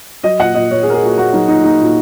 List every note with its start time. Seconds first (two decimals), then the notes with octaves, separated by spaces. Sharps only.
0.23 F#3 D#5
0.39 A#2 F#5
0.54 A#2 D#5
0.71 A#2 C#5
0.83 G#4
0.86 A#2 A#4
0.94 G#4
1.02 A#2 F#4
1.17 A#2 F#4
1.33 F#3 D#4
1.48 A#2 D#4
1.64 A#3 D#4
1.80 A#2